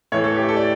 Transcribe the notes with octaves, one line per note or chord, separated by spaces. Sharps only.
A2 E3 A3 C#5
A4
G4
A4
D5